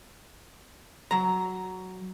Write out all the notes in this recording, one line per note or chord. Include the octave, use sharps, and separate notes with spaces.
F#3 A#5